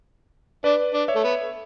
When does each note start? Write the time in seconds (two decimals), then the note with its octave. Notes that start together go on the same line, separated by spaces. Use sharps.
0.64 D4 B4 D5
0.93 D4
1.08 C#5 E5
1.15 A3
1.24 B3